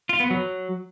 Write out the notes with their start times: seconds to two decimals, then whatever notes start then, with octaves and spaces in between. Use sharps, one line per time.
0.09 F4
0.20 B3
0.31 F#3